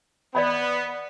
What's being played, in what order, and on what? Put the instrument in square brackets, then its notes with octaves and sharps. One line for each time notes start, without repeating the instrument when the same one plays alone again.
[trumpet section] B3 [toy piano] D5 D#5 B5